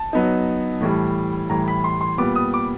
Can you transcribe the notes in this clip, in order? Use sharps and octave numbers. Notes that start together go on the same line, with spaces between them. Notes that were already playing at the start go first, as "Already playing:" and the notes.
Already playing: A5
F#3 B3 D#4
A2 E3 G3
A2 E3 G3 A#5
B5
C6
C6
A#2 G3 B3 D6
D#6
D6